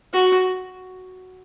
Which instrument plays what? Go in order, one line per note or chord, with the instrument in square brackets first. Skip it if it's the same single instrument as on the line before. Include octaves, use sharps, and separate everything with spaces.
[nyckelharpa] F#4